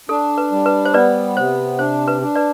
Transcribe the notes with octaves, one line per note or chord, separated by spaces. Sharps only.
D4 A4
B4
G3
B4
C5
B3 B4 D5
C3 C5
D4 C5
B4
D4
B4 D5